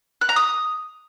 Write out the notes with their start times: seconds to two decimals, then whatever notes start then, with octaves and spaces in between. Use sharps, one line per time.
0.21 F#6
0.29 A#5
0.36 D#6